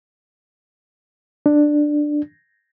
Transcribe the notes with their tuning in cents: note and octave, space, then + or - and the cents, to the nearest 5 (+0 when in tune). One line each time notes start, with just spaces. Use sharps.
D4 +10